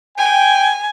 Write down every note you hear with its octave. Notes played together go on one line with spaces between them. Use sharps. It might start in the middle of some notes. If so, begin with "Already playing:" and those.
G5 G#5